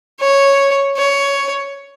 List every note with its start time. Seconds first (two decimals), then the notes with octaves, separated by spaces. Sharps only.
0.20 C#5
0.97 C#5